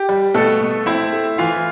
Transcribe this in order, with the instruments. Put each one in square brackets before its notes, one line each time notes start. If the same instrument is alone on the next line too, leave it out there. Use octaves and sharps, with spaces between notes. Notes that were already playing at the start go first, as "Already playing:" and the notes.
Already playing: [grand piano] G4
G3
B2 A3 A4
B2
C4 E4 E5
A3
E3 F4 F5